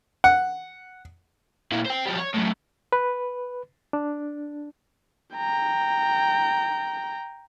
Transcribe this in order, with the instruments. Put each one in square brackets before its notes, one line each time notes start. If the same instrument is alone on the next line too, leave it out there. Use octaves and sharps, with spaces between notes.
[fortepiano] F#5
[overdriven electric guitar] A#2 E4
C5 G5
F3 G3
C#5
F#2 A2
[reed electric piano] B4
D4
[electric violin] G5 A#5